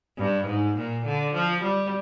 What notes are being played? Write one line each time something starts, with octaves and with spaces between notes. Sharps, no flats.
G2
G#2
A#2
D3
F3
G3